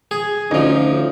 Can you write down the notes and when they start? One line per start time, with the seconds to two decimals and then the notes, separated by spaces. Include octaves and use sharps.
0.11 G#4
0.51 D2 F3 C#4 D#4